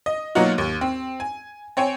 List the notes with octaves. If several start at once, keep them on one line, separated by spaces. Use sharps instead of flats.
D#5
B2 F#3 A#3 D#4 F4 F#4
D#2
C4
G#5
C4 C#5 G5 G#5